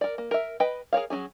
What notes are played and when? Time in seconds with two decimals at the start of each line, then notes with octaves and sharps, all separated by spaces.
0.01 A#4 D5
0.18 A#3
0.31 A#4 E5
0.60 B4 D#5 G5 B5
0.93 G#4 A#4 C#5 F5
1.10 F#3 C4 C#4 G#4